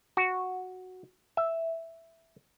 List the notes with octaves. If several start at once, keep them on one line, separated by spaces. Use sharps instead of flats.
F#4
E5